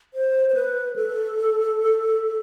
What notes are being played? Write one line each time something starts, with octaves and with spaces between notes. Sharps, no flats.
C5
C5
B4
A4